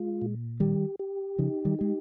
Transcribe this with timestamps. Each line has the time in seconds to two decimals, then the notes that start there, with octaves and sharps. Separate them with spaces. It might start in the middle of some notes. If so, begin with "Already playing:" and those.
Already playing: G#3 F4
0.22 A#2
0.60 D#3 G3 G4
0.99 G4
1.38 C#3 F3 D#4
1.65 D#3 G3
1.79 G#3 G4